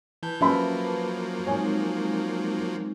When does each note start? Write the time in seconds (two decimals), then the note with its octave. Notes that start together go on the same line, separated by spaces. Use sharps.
0.23 E3 B4 A5 G6
0.41 F3 F#3 A#3 C#4 E5 B5
1.47 G#3 C4 D#4 C#5 G#5